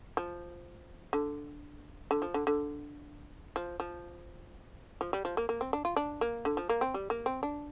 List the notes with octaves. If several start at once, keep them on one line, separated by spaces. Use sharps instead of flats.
F3
D3
D3
F3
D3
D3
F3
F3
F3
G3
F3
A#3
A#3
C4
D4
F4
D4
A#3
D3
F3
A#3
C4
G3
A#3
C4
D4